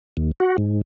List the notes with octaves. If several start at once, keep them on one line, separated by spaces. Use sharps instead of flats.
D#2
F#4
G#2